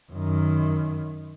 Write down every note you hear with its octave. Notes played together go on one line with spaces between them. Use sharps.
F#2 D#3